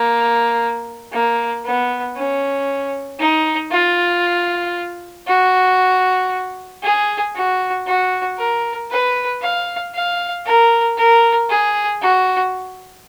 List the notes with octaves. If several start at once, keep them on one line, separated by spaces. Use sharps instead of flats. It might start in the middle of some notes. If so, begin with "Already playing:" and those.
Already playing: A#3
A#3
B3
C#4
D#4
F4
F#4
G#4
F#4
F#4
A#4
B4
F5
F5
A#4
A#4
G#4
F#4